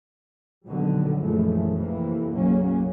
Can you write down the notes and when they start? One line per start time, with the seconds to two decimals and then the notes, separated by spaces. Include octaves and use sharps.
0.67 A#1 B2 D3 D#3 F#3 G3
1.19 A#1 F#2 E3 F3 G#3 A3
1.73 F2 C3 E3 A#3
2.32 F#1 B1 C#3 F#3 A#3 C#4